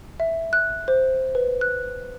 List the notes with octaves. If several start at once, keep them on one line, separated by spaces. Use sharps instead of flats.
E5
F#6
C5
B4
F#6